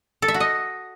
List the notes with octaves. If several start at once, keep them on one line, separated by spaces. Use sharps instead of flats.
A4
E5
F#4
D#5